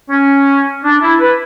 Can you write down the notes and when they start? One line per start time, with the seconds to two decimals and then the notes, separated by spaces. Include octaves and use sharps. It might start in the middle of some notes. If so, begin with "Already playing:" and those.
0.09 C#4
0.82 D4
1.00 E4
1.19 B4